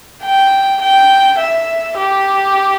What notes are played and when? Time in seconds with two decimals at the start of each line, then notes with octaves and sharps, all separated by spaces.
0.24 G5
0.81 G5
1.39 E5
1.97 G4